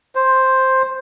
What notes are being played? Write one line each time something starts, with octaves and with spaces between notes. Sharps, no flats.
C5